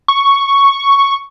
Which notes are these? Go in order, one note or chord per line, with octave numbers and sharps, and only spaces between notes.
C#6